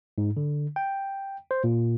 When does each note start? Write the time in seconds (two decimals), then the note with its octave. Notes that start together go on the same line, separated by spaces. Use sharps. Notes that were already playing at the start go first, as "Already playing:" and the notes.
0.18 G#2
0.37 D3
0.76 G5
1.51 C5
1.64 A#2